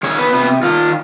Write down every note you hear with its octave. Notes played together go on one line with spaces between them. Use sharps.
D#3 C#4 C#5
B3 B4
C3 B3 B4
D#3 F4